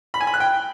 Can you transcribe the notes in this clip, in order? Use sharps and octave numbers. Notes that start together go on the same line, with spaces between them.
B5
G#5
B5
F#6
G5